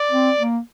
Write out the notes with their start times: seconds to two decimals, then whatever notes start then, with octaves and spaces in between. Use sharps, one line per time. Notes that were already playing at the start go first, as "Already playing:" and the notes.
Already playing: D5
0.11 C4
0.39 A#3